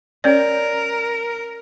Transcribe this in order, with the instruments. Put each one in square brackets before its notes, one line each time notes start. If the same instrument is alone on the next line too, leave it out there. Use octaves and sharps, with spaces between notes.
[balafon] C#4 C#5 D5 [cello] A#4